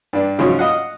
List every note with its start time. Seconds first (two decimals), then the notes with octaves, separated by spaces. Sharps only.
0.13 G2 D4
0.38 G#2 C#3 F3 F#3 C#4
0.59 D#5 F5 F#5